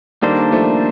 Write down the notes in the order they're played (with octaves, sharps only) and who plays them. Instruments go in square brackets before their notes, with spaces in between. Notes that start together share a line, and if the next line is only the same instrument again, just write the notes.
[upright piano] D#3 G3 [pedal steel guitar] A#3 D4 A4 C5
[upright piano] F3 A3